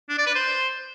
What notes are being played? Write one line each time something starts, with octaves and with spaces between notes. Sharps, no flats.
D4
D5
B4
C5